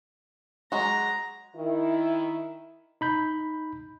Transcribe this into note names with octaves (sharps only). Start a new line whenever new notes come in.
F#3 G#3 F#4 A#5
D#3 E4
D#4 B5 G6